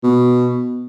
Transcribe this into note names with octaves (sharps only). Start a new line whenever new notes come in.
B2